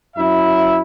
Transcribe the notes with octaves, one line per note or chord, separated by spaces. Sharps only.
F#2 E4 E5